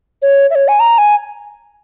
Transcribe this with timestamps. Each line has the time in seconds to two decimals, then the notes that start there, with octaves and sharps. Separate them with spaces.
0.22 C#5
0.50 E5
0.55 C#5
0.68 G#5
0.80 A#5
0.98 G#5